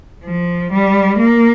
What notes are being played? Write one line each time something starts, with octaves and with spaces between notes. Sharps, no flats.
F3
G3
A#3